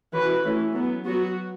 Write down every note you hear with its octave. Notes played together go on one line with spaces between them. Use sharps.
E3 C#4 F#4 B4
E3 A3 C#4
F#3 B3
F#3 B3 F#4